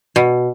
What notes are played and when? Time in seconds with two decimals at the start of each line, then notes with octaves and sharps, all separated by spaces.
0.16 B2